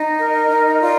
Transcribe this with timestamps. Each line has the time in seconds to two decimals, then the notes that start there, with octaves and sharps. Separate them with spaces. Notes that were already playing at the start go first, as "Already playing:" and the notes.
Already playing: D#4 D#5
0.19 A#4
0.50 D#4
0.80 F4 D5